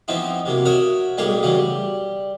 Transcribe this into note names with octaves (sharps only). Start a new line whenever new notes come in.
E3 F3 B3 C4 D#4 E4
C3 F#3 A#3
F#4 A#4 C#5 D#5 E5 F#5
B1 A2 G3 A#3 G#4 C#5
C#3 E3 F#3 G3 A#3
G3